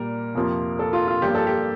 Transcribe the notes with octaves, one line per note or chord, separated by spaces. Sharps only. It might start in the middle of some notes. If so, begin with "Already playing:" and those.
Already playing: A#2 G3 A#3 A#4
F2 C3 F3 A#3
A4
F4
F4
G2 F3 A#3 G4
A4
G4